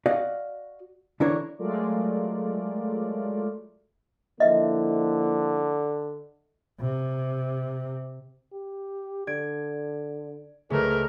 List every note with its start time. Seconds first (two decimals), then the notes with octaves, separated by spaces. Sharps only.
0.06 F#4 D5 D#5 F5
1.20 D3 E3 D4 E4 A#4 C#5
1.59 F#3 G#3 A3 F4 A#4 D5
4.40 D3 F3 A#3 E4 D#5 E5
6.80 C3
8.53 G4
9.27 D3 D5 G#6 D7
10.71 C#2 C#3 A3 G#4 A#4 B4